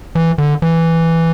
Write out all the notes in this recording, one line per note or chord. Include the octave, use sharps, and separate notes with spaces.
E3
D3
E3